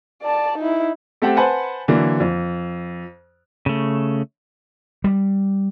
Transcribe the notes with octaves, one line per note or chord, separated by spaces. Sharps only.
D5 A5
D#4 E4
A3 C4 G4 A4 F#5 G5
B4 C5 F#5 G#5 A5 B5
D3 E3 F#3 A#3
F2
C#3 A3
G3